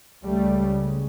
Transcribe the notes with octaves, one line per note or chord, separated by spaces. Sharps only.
C#2 C#3 G3 A3